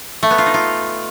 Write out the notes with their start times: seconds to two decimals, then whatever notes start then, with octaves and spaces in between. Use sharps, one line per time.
0.23 A3
0.30 B3
0.38 F4
0.46 D#4
0.54 F4